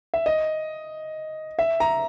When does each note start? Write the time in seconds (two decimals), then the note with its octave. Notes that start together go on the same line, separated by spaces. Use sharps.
0.14 E5
0.26 D#5
1.59 E5
1.80 A#5